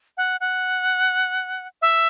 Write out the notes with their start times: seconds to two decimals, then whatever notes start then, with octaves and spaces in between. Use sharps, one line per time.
0.17 F#5
0.40 F#5
1.82 E5